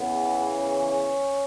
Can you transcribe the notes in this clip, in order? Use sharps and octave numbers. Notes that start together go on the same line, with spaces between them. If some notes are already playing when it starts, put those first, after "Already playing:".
Already playing: E2 C#3 E3 B3
C#4